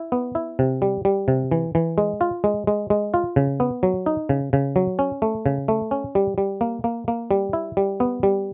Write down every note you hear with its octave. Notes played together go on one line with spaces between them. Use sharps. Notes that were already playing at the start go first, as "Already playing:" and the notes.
Already playing: E4
B3
E4
C3
G3
G3
C3
E3
E3
G#3
F4
G#3
G#3
G#3
F4
C#3
B3
F#3
D#4
C#3
C#3
F#3
C#4
A3
C#3
A3
C#4
G3
G3
A#3
A#3
A#3
G3
E4
G3
B3
G3